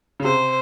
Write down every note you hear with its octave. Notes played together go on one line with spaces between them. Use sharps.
C#3
C3 C5